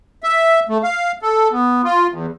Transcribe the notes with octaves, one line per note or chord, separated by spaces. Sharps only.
E5
A3
F5
A4
B3
F4
E2